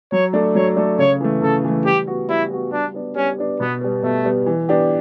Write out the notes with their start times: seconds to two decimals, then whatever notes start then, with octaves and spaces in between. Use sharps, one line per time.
0.12 F#3 C#5
0.33 A3 D4 A4
0.55 F#3 C#5
0.76 A3 D4 A4
0.98 C#3 C#5
1.21 E3 A3
1.42 C#3 A4
1.64 E3 A3
1.85 G3 G4
2.07 B3 F#4
2.29 G3 E4
2.50 B3 F#4
2.72 G3 D4
2.94 B3 D4
3.16 G3 C#4
3.38 B3 D4
3.60 B2 B3
3.81 G3 B3
4.03 B2 A3
4.24 G3 B3
4.46 E3
4.69 B3 D4 G4